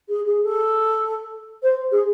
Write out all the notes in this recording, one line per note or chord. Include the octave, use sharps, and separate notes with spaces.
G#4
G#4
A4
C5
G#4